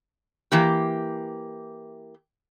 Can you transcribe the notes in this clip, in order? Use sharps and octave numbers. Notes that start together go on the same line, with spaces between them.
E3 A#3 G4